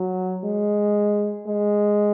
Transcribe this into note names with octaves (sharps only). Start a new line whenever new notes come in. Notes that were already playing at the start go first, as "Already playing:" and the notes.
Already playing: F#3
G#3
G#3